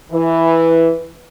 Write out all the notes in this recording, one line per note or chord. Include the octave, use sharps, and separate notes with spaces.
E3